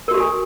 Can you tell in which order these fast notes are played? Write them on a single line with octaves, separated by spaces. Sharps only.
A#4 F#4 G4 A4 G#5